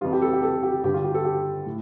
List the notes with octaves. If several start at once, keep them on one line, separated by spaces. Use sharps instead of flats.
F2 E3 G3 F4
G4
A4
G4
A4
G4
G2 D3 G3 G4
F4
G4
A4
G4
A2